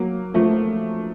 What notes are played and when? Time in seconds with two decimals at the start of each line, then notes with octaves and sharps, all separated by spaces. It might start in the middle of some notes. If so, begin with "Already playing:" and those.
Already playing: F#3 A#3
0.34 F3 A3